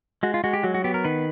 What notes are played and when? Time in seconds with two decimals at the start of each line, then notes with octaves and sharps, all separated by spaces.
0.23 G#3 F#4
0.34 F4
0.44 G#3 F#4
0.53 G4
0.63 F#3 F#4
0.74 F#4
0.84 B3 G4
0.94 A#4
1.04 D#3 B4